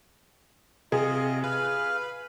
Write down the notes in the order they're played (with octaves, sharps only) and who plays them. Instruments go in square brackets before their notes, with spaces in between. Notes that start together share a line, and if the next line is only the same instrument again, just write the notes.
[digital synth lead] C3 [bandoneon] F4 D#5 [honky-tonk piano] G#4
[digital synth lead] B4 [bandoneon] F5